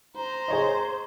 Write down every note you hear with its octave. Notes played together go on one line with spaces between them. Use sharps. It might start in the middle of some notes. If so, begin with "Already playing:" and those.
C5 A#5
G#4 C#5 D#5